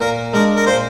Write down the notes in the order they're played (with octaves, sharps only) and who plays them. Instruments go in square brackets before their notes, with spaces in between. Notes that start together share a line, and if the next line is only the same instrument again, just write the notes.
[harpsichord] A#2 [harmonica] A#4
[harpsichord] G#3 D4 [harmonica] A#4
[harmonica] A#4
[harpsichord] A#2 [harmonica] C5